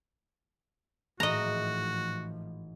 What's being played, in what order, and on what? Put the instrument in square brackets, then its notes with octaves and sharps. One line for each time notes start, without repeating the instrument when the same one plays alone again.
[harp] G#1 E3 D#4 [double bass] A2 F3 [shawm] F#4 [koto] D#5 A#5